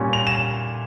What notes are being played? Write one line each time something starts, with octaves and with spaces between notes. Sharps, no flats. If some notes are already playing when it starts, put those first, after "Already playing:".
Already playing: A#2 G3 C#4
F7
E7